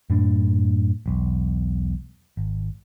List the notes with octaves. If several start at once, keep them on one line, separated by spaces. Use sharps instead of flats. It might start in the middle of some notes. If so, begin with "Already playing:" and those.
F#2 A2 D4
E1 B1
G#1